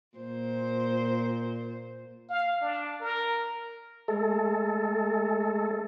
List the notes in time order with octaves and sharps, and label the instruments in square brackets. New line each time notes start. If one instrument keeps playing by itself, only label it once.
[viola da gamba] A#2 C5
[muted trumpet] F5
D4
A#4
[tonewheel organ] G#3 A3 A4